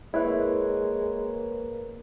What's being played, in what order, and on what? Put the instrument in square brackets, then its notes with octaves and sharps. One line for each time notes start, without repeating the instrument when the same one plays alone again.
[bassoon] G#3 [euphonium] A#3 [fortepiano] E4 [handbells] B4 C#5